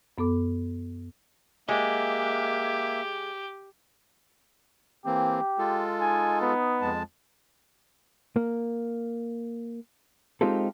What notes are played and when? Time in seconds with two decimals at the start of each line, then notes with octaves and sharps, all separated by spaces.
0.18 F#2 B3 A4 D6
1.69 G#3 A#3 G4 E5
5.06 E3 A#3 C4 G4
5.59 G#3 F4 A4
6.01 D#4 G#5
6.41 B3
6.81 F2 G#3 A5
8.36 A#3
10.41 G#3 C4 D#4 F4 G4 A4